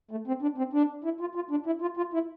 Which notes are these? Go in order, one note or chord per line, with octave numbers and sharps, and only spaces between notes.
A3
C4
D4
C4
D4
E4
F4
F4
D4
E4
F4
F4
E4